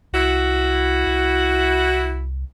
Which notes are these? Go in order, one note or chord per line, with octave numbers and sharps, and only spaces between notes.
C2 E4 F#4
C2